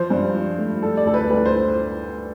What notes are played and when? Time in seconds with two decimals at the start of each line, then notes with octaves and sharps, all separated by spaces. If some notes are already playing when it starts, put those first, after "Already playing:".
Already playing: F3 C5
0.10 G2
0.35 F3
0.58 A3
0.82 G3 A4
0.97 D5
1.05 D2 A4
1.14 B4
1.30 D2 B4
1.46 C5